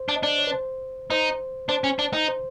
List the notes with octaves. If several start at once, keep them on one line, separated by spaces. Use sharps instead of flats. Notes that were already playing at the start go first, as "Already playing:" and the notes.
Already playing: C5
D4
D#5
D4 D5
C#5
B4
C5
D#4 C5
D4 C5
C#4
D4
D#4
C5